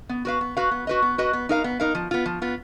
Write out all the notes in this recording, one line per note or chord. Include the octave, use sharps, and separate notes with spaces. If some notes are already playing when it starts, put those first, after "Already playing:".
B3
F#4 B4 F5
B3
F#4 B4 F5
B3
F#4 B4 D#5
B3
F#4 B4 D#5
B3
D#4 A#4 F5
B3
D#4 A#4 F5
F3
B3 F4
F3
B3 F4